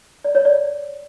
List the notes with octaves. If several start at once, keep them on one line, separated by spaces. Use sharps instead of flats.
D5
C#5
D5